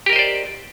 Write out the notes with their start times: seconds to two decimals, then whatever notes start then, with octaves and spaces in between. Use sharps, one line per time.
0.06 G4
0.10 A#4
0.13 D#5
0.16 C5
0.19 D5